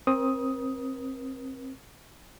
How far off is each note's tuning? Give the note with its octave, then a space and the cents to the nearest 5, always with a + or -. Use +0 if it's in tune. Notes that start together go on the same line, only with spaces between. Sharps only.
C4 +25 A#4 +45 D#6 +10